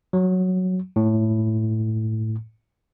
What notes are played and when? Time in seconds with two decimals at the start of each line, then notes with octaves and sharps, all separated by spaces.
0.13 F#3
0.96 A2